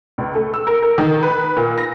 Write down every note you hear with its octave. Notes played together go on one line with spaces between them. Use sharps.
C#2
A3
E6
A#4
A#4
D#3
B4
A#2
A#6